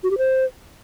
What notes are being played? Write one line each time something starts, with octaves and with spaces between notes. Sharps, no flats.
F#4
G4
C5